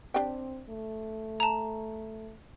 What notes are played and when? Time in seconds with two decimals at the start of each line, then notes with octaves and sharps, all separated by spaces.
0.14 C4 D4 G4 G5
0.69 A3
1.40 A5 A#5